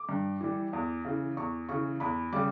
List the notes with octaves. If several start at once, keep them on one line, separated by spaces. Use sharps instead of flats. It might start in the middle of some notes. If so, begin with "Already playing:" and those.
Already playing: D6
G2
E3 G3
E2
C#3 E3
E2 C#6
C#3 E3 C#6
E2 B5
C#3 G3 D6